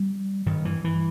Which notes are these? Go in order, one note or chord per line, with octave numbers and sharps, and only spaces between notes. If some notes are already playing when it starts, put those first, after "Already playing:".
Already playing: G3
G2 D#3
E3
E3